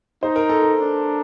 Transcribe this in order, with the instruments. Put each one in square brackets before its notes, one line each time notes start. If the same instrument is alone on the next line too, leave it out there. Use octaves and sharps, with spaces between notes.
[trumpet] D#4 [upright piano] C5
[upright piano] A#4
A4
A#4
[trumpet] D4